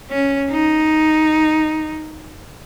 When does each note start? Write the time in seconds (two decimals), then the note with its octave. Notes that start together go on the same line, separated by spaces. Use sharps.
0.11 C#4
0.51 D#4